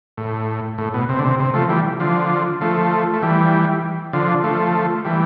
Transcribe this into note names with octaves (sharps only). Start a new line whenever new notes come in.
A2
A2
B2
C3
D3
C3
C3
F3 A3
E3 G3
D3 F3
F3 A3
A3
E3 G3
D3 F3
F3 A3
E3 G3